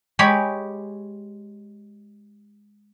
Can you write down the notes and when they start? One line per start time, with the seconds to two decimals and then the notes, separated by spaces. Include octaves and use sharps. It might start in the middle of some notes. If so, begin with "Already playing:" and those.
0.19 G#3 G4 C#5 B5